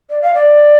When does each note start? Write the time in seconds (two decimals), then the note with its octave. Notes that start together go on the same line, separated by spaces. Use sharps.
0.10 D5
0.21 F5
0.34 D5